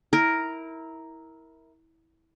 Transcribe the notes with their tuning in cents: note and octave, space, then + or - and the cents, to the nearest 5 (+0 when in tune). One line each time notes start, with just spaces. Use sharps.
E4 -20 A#4 +0